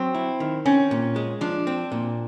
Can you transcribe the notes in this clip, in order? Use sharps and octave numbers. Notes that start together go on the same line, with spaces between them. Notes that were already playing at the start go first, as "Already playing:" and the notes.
Already playing: F#3 C4
E4
D#3
C4 C#4
A#2
G#3
F3 D4
C4
A#2